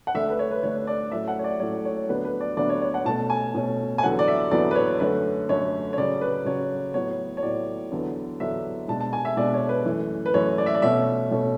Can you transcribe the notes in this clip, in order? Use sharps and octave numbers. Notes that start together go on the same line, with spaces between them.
F#5
D2 D3 A3 D4 E5
B4
C#5
B4
D2 D3 A3 D4 C#5
D5
A2 F#3 A3 C#4 E5
F#5
C#5
D5
A2 F#3 A3 C#4 C#5
C#5
D2 D3 F#3 B3 D4 B4
B4
D5
D2 D3 F#3 B3 D4 D5
C#5
C#5
F#5
B2 A3 C#4 A5
G#5
B2 A3 C#4
G#5
E2 D3 F#3 B3 F#5
D5
E5
E2 D3 F#3 B3 D5
B4
C#5
F#2 D3 A3 C#4 B4
F#2 D3 A3 C#4 C#5
C#5
C#3 F#3 C#4 D5
B4
C#3 F#3 C#4 C#5
A2 F#3 B3 C#5
C#5
A2 F#3 B3 D5
E2 D3 F#3 B3 D4
E2 D3 F#3 B3 D4 E5
B2 G#3 D4 A5
A5
G#5
E5
B2 G#3 D4 D5
C#5
B4
F#2 E3 A3
B4
F#2 E3 A3 C#5
D5
E5
D5
B2 A3 C#4 E5
B2 A3 C#4